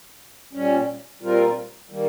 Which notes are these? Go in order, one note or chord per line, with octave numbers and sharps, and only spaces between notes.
A#2 G3 C#4
A#2 G3 C4 F4 A#4
D#3 G3 A#3